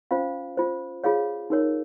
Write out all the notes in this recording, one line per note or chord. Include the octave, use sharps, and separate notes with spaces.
C#4 F4 C5 F5
F4 C5
F4 G#4 C#5 F5
D#4 A#4 C#5